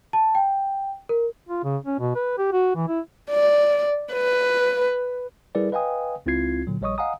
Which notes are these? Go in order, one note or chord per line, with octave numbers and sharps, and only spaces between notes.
A5
G5
A#4
F4
C#3
C#4
B2
B4
G4
F#4
E3
E4
D5
B4
G3 E4 G#4 A#4 B4 D5
B4 D#5 F5 G5 G#5 D#6
C#2 C4 E4 F4 G#6 C7
A#2 D3 F#3
A#1 G3 C#5 D#5 C#6 D#6
D#5 F5 F#5 G#5 A#5 D#6